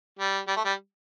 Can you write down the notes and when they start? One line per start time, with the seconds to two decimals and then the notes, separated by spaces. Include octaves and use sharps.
0.19 G3
0.48 G3
0.56 A3
0.65 G3